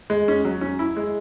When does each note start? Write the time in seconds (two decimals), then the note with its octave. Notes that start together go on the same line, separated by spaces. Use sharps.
0.10 G#3
0.28 C#4
0.45 F#3
0.61 C#4
0.79 E4
0.97 G#3